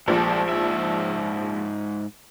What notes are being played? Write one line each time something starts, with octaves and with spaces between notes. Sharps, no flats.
A#1 F3 G#3 G4 A4
G#2 E5